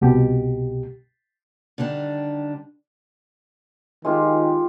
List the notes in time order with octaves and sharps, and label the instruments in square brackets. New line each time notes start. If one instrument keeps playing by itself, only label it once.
[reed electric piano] C2 B2 G4
[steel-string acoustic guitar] D3 D#3 G3 D4
[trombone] D#3 [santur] G#3 F4 G4